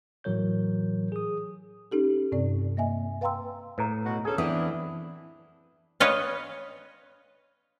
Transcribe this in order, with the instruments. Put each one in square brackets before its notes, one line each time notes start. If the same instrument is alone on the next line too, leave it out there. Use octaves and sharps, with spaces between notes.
[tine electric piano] A2 E3 F#3 A#4 C#5 G6
G#4 D#6
[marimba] C#4 D#4 G4 A4
G2 C3 C4 D5
A#3 D#5 E5 G#5
B4 F5 G5 A#5 C6 E6
[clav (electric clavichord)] A2 [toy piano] B4 A#5
[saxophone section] B2 F#4
[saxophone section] D2 C#4 A4 [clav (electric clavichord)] G#4
[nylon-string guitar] E3 C4 [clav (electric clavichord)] B3 [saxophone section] D4 E4 [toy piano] D#6
[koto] B4 C#5 D#5 F5